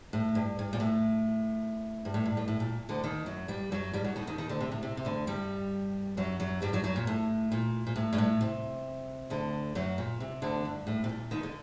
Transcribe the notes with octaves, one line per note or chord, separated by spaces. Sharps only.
A2
G2
G2
A#2
A2
G2
A2
G2
A2
A2
A#2
D2 D3
D#2 D#3
F#2 F#3
G2 G3
F#2 F#3
G2 G3
F#2 F#3
D#2 D#3
D#2 D#3
D#2 D#3
D2 D3
C3
A2
C3
C3
D2 D3
G2 G3
F#2 F#3
F#2 F#3
G2 G3
F#2 F#3
F#2 F#3
A#2
A2
A#2
A#2
A2
G2
A2
C3
D2 D3
F#2 F#3
A#2
C3
D2 D3
G2
A2
C3
A#2
D#2 D#3
D3